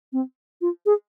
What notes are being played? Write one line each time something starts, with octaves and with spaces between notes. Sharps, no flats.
C4
F4
G#4